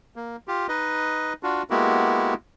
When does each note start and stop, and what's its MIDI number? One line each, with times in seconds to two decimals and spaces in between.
0.16 0.36 58
0.48 0.67 65
0.48 0.67 67
0.68 1.33 63
0.68 1.33 71
0.68 1.33 75
1.43 1.63 62
1.43 1.63 65
1.43 1.63 66
1.70 2.34 56
1.70 2.34 58
1.70 2.34 59
1.70 2.34 64
1.70 2.34 66
1.70 2.34 67